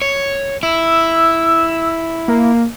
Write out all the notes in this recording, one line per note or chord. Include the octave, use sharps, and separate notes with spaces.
C#5
E4 E6
A#3